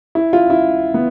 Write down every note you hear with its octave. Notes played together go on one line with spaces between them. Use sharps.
E4
F4
E4
B3